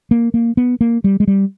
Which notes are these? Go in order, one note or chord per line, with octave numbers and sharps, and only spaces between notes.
A#3
A#3
B3
A#3
G3
G#3
G3